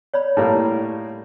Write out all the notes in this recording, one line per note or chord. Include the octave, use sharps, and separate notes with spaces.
C#5 D5 B5
A2 G3 A#3